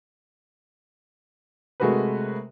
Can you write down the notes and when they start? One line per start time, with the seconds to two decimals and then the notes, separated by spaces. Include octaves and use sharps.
1.80 C3 G#3 A3 F#4 A#4 B4